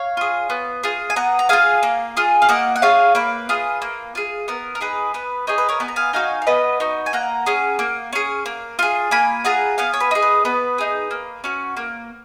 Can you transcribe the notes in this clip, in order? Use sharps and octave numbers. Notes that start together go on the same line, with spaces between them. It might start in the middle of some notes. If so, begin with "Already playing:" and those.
Already playing: C#5 F5
F4 G#4
B3
F4 G#4
G#5
B3 F#5 A#5
A#5
F4 G#4 F5 G#5
A#3
F4 G#4
F5
A#3 D#5 F#5
F#5
F4 G#4 C#5 F5
A#3 B4
F4 G#4
A#3
F4 G#4
B3 A#4
A#4
D#4 G#4 B4
B3 B4
D#4 G#4 C#5
B4
A#4 C#5
B3 G#5
A#5
F5 G#5
D#4 F#4 F5 G#5
F5
B3 B4 D#5
D#4 F#4
G#5
A#3 F#5 A#5
C#4 G#4
A#3
C#4 G#4
A#3
F4 G#4
A#3 G#5 B5
F4 G#4 F#5 A#5
B3 F5 G#5
C#5
B4
D#4 G#4
B4
B3 B4
D#4 G#4
A#3
C#4 F#4
A#3